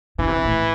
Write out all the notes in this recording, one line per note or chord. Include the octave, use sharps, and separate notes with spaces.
D3 E3
C3
A2